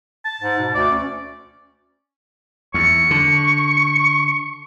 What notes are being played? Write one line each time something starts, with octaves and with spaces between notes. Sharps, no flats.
A5
G#2
B2
D2 D5
C#4
E2 C#6
D3